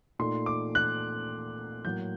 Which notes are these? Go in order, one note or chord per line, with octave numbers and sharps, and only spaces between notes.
A#2 A3 D#4 C6
D6
F#6
A2 F#3 A#3 G6